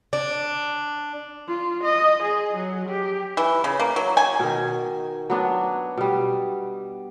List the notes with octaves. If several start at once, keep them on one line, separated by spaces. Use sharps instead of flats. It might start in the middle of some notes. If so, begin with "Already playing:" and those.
D4
F4
D#5
G#4
F#3
G4
E3
C#3
A#3
F#3
G#5
B2 D#3
F#3 B3 D4
B2 G3